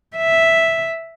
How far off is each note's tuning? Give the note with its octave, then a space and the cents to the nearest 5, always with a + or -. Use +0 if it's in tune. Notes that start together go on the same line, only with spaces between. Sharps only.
E5 -5